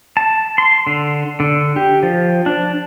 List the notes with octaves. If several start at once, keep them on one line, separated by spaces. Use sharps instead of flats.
A5
C6
D3
D3
G4
F3
D4